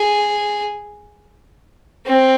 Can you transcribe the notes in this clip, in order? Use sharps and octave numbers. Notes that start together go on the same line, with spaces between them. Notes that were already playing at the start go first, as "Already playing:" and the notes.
Already playing: G#4
C4